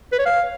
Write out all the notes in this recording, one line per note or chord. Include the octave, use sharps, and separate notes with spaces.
B4
C#5
F5